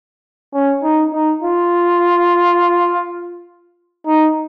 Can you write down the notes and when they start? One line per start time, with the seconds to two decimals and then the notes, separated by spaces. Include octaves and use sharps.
0.54 C#4
0.83 D#4
1.13 D#4
1.42 F4
4.07 D#4